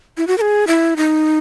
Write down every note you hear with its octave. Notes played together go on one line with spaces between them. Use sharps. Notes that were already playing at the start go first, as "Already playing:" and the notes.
E4
F#4
A#4
G#4
E4
D#4